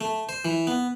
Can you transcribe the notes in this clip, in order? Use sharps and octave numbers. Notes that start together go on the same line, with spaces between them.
A3
C5
E3
B3